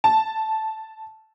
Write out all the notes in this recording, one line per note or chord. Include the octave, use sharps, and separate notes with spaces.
A5